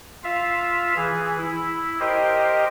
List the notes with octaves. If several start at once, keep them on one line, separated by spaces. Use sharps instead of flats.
F4 E5 F5
E3 G#4
E4
G4 A#4 C5 D#5